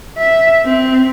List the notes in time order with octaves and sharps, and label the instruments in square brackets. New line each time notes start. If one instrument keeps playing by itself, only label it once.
[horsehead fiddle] E5
C4